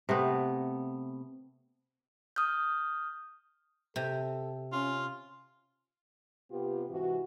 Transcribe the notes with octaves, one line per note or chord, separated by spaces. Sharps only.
C3 A3 B3
D#6 F6 G6
C3 A4
C#4 F4
C3 B3 F4 G4
G#2 C3 E3 F#4